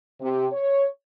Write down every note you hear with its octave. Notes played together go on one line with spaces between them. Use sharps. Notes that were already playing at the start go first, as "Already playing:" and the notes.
C3
C#5